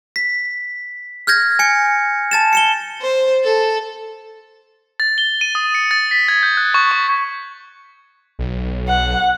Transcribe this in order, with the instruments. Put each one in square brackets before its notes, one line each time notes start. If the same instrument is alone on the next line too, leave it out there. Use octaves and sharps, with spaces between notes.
[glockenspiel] B6
F6 G6 G#6 A#6
G#5 C#7
A5 A6 E7
C#7 E7 G7
[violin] C5
A4
[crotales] A6
G7
D#7
D#6
C#7
A6
B6
G#6
G6
F#6
C#6
C#6
[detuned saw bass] B1
[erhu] F#5